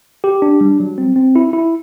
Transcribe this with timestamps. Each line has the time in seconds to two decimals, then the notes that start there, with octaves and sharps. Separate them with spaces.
0.24 G4
0.42 D4
0.61 G3
0.80 F#3
0.98 C4
1.16 C4
1.36 E4
1.53 E4